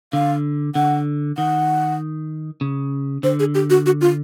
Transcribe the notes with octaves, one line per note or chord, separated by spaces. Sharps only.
D3 F5
D3 F#5
D#3 F#5
C#3
D3 C5
G#4
G4
F#4
F#4
F4